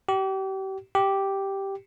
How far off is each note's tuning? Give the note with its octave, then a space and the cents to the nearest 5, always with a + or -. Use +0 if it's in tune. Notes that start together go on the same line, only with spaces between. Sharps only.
G4 -35
G4 -5